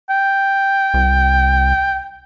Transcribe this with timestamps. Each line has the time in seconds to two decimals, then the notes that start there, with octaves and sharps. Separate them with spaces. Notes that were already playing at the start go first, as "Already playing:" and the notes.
0.10 G5
0.94 C2